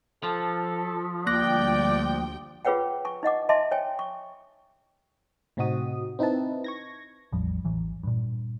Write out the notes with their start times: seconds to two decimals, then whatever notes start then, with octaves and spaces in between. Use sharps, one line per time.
0.23 F3 A4
1.27 D2 G3 A#3 D5 G5 F#6 A#6
2.65 F4 G#4 B4 C#5 F#5 G5
3.05 G#5 C#6
3.23 D#4 D#5 F#5 D6
3.49 D#5 E5 G#5 A5 C6 D6
3.71 C#5 G5 G#5
3.99 C#6
5.57 A2 C3 C4 D#4 F#4 D#6
6.19 C4 D#4 E4 B4 A5
6.64 C#6 G#6 A#6
7.32 A1 E2 F3 G3
7.64 A1 E3 F#3
8.03 G2 A#2